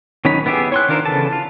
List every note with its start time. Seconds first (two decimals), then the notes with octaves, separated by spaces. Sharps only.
0.25 D#3 F#3 C#4 D#4 B5
0.46 B3 E4 G4 G#4 E5
0.72 C#5 C6 F#6
0.89 D#3 D4 F4 A#4 C5
1.06 C#3 E3 B3 A4 A5
1.32 F4